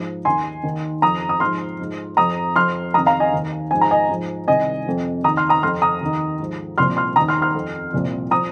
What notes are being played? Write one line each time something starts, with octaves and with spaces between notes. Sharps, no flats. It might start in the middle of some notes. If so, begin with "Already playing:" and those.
Already playing: G#2 F3
D#2 D#3 G#5 C6
D#2 D#3
F2 F3 A#5 D#6
D#6
G#2 F3 C6 F6
G#2 F3
F2 F3 A#5 D#6
F2 F3 C6 F6
F2 C3 D#3 A#5 D#6
F5 A#5
D#5 G#5
D#2 D#3
G#2 F3 G#5
A#5
D#5 G#5
G#2 F3
C2 C3 D#3 D#5 G#5
F2 C3 F3
D#2 D#3 A#5 D#6
C6 F6
A#5 D#6
F2 C3 F3 C6 F6
A#5 D#6
D#2 D#3
G#2 F3
C2 A#2 F3 C6 F6
C6 F6
D#2 D#3 A#5 D#6
C6 F6
C6 F6
F2 F3
C2 A#2 F3
F3 A#5 D#6